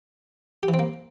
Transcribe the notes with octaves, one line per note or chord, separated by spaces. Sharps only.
G4
E3
C4
A#3